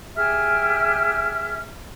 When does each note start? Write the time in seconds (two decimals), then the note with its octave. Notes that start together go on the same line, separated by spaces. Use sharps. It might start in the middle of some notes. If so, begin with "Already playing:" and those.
0.15 G4 G#4 E5 F6